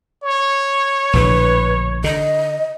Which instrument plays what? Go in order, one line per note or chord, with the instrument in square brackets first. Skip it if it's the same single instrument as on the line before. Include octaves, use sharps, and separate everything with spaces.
[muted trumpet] C#5
[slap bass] A#1 A2 D3 [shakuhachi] B4
[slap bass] D3 [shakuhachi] D#5